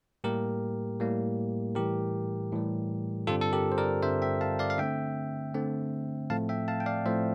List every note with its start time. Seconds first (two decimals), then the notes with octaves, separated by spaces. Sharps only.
0.24 A2 G3 A#3 G4 A#4
1.00 A2 G3 A#3
1.75 A2 E3 G3 G4 A#4
2.52 A2 E3 G3
3.27 G2 D3 G3 C4 F4 A4
3.41 A4
3.53 G4 A#4
3.72 C5
3.78 A#4 D5
4.03 G2 D3 G3 C4 C5 E5
4.22 E5 G5
4.41 F5 A5
4.59 D5 F5
4.70 F5
4.78 D3 A3 C4 E5 G5
5.54 D3 A3 C4
6.30 A2 F3 A3 C4 F5 A5
6.49 E5 G5
6.68 F5 A5
6.80 G5
6.86 D5 F5
7.06 A2 F3 A3 C4 C5 E5